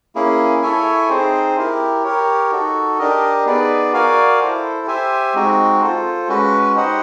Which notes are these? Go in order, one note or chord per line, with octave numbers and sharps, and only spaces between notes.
A#3 C#4 E4 G#4
E4 A4 C#5 E5 G#5
C4 D#4 G#4 C5
E4 G4 A#4
G4 A#4 C#5
D#4 F#4 A4
D4 G4 A#4 D#5
B3 D#4 G#4 B4 D5
F#4 A#4 D5 F5 G#5
E4 A4 C5
G4 C5 E5 G#5
G#3 C4 D#4 F#4
F4 A4 C5
G#3 C#4 F#4 B4
D#4 G4 C5 D#5 F#5